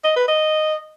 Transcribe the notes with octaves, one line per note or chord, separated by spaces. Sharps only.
D#5
B4
D#5